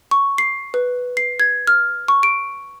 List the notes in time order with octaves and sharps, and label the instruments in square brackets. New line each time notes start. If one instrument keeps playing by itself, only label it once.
[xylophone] C#6
C7
B4
C7
G#6
F6
C#6
D7